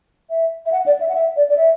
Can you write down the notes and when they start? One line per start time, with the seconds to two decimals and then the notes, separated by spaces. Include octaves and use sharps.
0.30 E5
0.66 E5
0.72 F#5
0.86 D5
1.00 E5
1.09 F#5
1.15 E5
1.36 D5
1.49 D5
1.57 E5